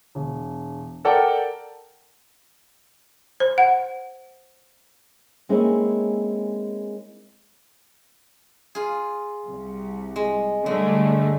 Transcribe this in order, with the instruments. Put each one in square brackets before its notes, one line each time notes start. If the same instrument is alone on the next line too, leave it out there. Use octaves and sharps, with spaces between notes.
[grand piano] E1
A4 A#4 D5 F#5 G5 A5
[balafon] C5
F#5
[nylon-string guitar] G#3 A#3 C4 C#4 D#4 E4
[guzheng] F4 G#4
[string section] C2
[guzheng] G#3
[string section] G2 D3 A3 [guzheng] G#3